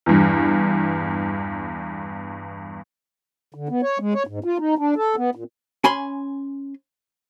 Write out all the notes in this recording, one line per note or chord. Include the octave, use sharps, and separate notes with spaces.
E2 G2
D3
B3
C#5
G#3
C#5
G#2
F4
D#4
D4
A4
B3
A#2
C#4 G#5 B5 C6